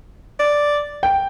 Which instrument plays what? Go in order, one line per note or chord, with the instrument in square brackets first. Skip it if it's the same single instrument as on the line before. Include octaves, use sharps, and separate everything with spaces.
[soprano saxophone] D5
[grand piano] G5